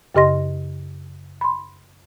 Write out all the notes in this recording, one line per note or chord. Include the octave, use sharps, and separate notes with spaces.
F#2 C#3 G4 D#5 C6 A#6
B5 C6